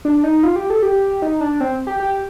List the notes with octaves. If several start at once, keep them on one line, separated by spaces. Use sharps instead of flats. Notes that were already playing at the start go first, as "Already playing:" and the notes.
D4
D#4
F4
G4
A4
G4
D#4
D4
C4
G4
G4